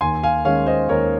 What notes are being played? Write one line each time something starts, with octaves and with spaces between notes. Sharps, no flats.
D#2 G#5 C6
F5 G#5
D#3 G#3 C#4 C#5 F5
C5 D#5
D#2 A#4 C#5